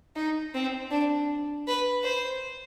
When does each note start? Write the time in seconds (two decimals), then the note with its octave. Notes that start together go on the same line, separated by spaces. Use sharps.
0.16 D#4
0.54 C4
0.91 D4
1.67 B4
2.04 C5